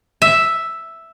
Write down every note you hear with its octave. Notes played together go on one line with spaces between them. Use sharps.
E5